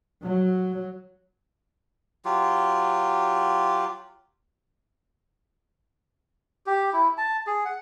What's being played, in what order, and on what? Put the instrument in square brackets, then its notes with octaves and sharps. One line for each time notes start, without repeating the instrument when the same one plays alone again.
[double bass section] F#3
[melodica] F#3 F4 G4
G4
E4
A5
G#4
F#5